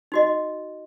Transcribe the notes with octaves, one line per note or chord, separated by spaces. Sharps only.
D#4 F#4 D#5